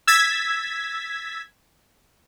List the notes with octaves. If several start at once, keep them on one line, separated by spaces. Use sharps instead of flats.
E6 G#6 A6 B6